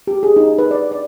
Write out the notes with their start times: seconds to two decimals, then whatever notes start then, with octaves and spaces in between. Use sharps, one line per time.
0.07 G4
0.23 G#4
0.36 D#4
0.58 B4
0.71 D5
0.91 D5